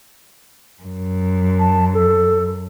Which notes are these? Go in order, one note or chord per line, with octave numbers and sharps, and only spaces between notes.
F#2
A5
A4